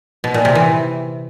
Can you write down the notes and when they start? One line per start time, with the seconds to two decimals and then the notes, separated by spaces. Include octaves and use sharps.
0.24 B2
0.34 A#2
0.45 C3
0.55 E3